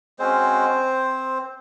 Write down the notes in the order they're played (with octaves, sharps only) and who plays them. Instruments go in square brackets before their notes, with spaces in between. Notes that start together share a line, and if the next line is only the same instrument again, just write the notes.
[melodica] G#3 C4 C#4 F#4 C5